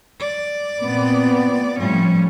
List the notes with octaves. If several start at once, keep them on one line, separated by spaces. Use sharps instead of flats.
D5
A#2 B3 C4
A2 F3 G3 C#4